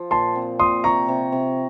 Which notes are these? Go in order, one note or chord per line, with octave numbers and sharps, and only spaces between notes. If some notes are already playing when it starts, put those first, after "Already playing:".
Already playing: F3
A#2 A5 C6
C4
A#2 C6 D#6
C3 A#5 C#6
C3
C3